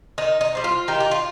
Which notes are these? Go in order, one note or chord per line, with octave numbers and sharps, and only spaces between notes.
D#3 D#4
D#4
G3 C4 D#4
F4
D#3 D#4 G4
G4
F4